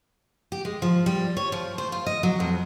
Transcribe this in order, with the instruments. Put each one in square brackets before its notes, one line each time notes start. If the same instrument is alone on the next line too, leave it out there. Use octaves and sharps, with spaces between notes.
[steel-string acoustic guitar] G4
G#3
F3
G3
C#5
F3
C5
F4
D#5
F#3
F2